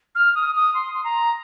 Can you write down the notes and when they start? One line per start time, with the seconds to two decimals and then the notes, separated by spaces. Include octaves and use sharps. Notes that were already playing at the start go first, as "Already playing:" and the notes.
0.15 F6
0.35 D#6
0.55 D#6
0.74 C6
0.94 C6
1.04 A#5